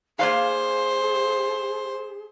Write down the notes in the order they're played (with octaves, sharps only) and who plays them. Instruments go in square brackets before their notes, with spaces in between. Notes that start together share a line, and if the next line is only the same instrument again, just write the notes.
[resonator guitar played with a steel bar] A#3 D5 F5 [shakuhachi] G#4 [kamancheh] C5